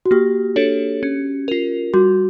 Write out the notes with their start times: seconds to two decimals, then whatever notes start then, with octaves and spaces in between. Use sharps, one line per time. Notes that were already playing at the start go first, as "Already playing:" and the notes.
0.06 F#4
0.11 A#3 G4
0.56 D4 F#4 A4 C#5
1.03 C#4
1.48 F4 A#4
1.94 G3 F#4